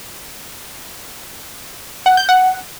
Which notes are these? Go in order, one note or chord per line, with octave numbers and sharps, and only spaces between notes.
F#5
G6
F#5